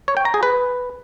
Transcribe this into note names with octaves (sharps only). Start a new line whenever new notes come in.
C#5
G5
A#5
G#4
B4